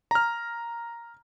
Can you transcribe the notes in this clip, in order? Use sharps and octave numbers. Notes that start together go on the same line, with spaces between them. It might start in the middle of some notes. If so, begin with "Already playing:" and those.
A#5 F6